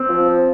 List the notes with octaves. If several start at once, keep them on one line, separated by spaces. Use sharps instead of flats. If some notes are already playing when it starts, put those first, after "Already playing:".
Already playing: C4
F3